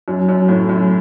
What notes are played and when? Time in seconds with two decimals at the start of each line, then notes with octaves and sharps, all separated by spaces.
0.08 F#2
0.29 F#2
0.48 A2
0.69 F#2